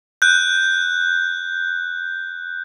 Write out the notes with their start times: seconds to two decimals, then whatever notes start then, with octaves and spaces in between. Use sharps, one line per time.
0.22 F#6 G6